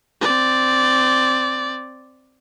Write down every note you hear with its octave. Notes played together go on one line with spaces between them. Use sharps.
C4 D5